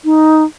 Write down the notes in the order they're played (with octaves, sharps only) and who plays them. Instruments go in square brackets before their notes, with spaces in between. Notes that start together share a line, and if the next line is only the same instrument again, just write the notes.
[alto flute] D#4